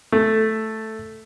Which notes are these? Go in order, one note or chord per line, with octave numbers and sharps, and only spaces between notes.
A3